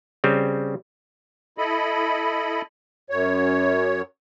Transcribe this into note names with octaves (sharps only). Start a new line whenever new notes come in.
C#3 G3 C4
E4 A4 D#5 B5
F#2 C#5